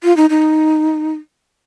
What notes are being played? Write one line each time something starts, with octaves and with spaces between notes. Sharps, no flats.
F4
D#4
D#4